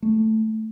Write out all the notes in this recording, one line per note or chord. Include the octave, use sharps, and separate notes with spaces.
A3